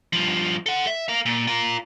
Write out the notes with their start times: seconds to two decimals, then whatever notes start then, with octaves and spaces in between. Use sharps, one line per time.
0.13 G2 F3
0.66 A4 F#5
0.87 E5
1.08 A#4 F5
1.26 A#2
1.47 F4 A#4